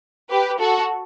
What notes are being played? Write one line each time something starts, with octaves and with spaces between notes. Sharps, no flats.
G4 B4
F#4 A4